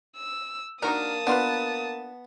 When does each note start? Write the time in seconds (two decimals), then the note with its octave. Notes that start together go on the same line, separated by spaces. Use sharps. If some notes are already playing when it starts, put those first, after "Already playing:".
0.17 E6
0.82 A#3 D4 D#4 F#4 A#4 A5 D#6
1.27 B3 D4 F4 B4